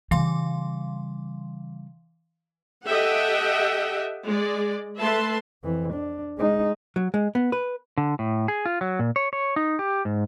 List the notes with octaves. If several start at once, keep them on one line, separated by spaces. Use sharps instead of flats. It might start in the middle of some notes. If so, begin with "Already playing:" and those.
C#3 E3 G3 F5 C6
G4 A4 D#5 E5 F#5 G5
G#3 D5
A3 B4 E5 A5 C6
F2 E3
D4
G#3 D#4
F#3
G#3
B3
B4
D3
A2
G#4
F4
F#3
A#2
C#5
C#5
D#4
G4
G#2